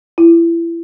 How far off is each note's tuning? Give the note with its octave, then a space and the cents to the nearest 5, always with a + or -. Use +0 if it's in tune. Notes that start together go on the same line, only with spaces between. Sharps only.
E4 +30